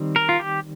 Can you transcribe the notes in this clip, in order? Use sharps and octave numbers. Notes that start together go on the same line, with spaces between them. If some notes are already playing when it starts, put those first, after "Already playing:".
Already playing: D#3 G3 C4
A#4
F4
G4